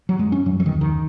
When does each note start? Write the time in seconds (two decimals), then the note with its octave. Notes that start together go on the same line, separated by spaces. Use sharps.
0.09 F#3
0.19 F#2 G#3
0.32 C#4
0.46 F#2 F#3
0.60 F#3
0.66 D#3
0.72 D#2
0.81 D#3